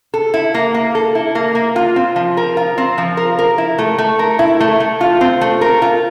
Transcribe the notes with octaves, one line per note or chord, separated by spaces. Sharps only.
A4
E4
A#3
A#3
A4
E4
A#3
A#3
F4
C4
F3
A#4
F4
C4
F3
A#4
A#4
E4
A3
A3
A#4
E4
A3
A3
F4
C4
A3
A#4
F4